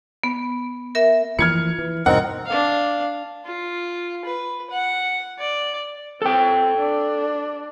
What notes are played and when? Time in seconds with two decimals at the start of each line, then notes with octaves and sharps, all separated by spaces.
0.24 B3
0.95 A#4 E5
1.39 E3 F3 A#3 F6 G#6 C#7
1.79 E3
2.06 E2 G2 B2 C4 D#4 A#4 F#5
2.46 D4 F5
3.45 F4
4.25 B4
4.70 F#5
5.39 D5
6.22 C4 A4 G5
6.78 D4